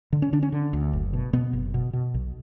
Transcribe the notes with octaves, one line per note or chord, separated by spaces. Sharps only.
D3
C#4
D3 D4
C#4
D3
D2
F#1
B2
B2 B3
F#1
B2
B2
B1